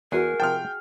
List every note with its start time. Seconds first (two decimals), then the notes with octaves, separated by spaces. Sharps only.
0.12 E2 F#4 G#4 A#4 G#5
0.40 C3 F3 G5 A5 F6